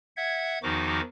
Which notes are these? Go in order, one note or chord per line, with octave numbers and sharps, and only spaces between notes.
E5 F#5 G#6
E2 D#3 F3 D#4 F#4 D6